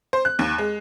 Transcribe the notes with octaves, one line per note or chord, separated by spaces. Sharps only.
C5
F#6
D#2
G#3